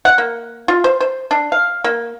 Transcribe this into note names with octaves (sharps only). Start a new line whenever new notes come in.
F#5
A#3
F4
C5
C5
D4
F5
A#3